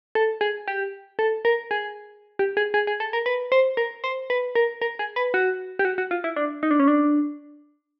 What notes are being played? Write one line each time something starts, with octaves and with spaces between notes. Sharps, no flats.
A4
G#4
G4
A4
A#4
G#4
G4
G#4
G#4
G#4
A4
A#4
B4
C5
A#4
C5
B4
A#4
A#4
G#4
B4
F#4
G4
F#4
F#4
F4
E4
D4
D#4
D4
C#4
D4